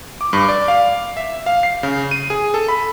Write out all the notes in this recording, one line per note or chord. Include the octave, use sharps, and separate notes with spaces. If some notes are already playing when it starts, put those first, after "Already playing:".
D6
G2
D5
F5
E5
F5
C7
C#3
D#7
G#4
A4
B5